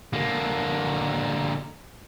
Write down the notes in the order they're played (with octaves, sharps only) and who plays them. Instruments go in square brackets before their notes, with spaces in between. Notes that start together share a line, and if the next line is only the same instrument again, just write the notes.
[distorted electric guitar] D3 A#3